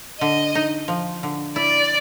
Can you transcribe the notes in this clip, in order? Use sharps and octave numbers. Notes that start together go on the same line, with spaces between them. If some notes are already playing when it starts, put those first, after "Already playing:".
D3 D#5
D#4
F3
D3
E4 D5